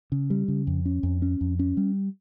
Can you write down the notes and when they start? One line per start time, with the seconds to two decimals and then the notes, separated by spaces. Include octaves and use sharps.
0.12 C#3
0.30 G3
0.48 C#3
0.67 F2
0.85 C#4
1.03 F2
1.22 C#4
1.41 F2
1.59 C#4
1.77 G3